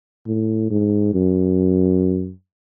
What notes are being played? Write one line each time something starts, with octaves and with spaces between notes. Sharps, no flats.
A2
G#2
F#2